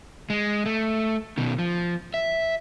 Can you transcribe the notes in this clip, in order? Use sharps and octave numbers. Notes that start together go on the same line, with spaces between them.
G#3
A3
B2 D#3
F3
E5